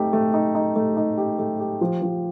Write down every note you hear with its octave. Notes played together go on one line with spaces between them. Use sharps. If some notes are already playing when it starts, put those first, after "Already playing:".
Already playing: A3 C4 D#4 G4
A3
D#4
D#4
A3
D#4
G4
A3
G4
F3
F3